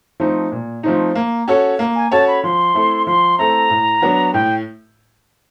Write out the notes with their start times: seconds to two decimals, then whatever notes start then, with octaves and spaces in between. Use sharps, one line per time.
0.20 F3 A3 C4 D#4
0.52 A#2
0.83 F3 A3 C4 D#4
1.15 A#3
1.48 C#4 F#4 A4 C#5
1.79 A#3
1.95 G#5
2.11 C#4 F#4 A4 C#5 A5
2.28 B5
2.43 F3 C6
2.74 A3 C4 E4 A4
3.07 F3 C6
3.38 A3 C4 E4 A4 A#5
3.70 A2
4.02 F#3 B3 D4 F#4
4.33 A2 G5